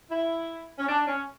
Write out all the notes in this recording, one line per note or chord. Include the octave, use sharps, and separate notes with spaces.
E4
C#4
D4
C#4